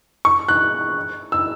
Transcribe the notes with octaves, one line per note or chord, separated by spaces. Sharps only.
C#6
F#6
E6